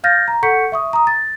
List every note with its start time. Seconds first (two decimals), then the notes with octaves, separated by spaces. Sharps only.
0.04 F5 F6 G6 A6 A#6
0.28 A#5
0.43 A4 F#5 C#6 G6 B6 C#7
0.72 E5 C#6 D#6
0.93 A#5 D#6
1.07 A6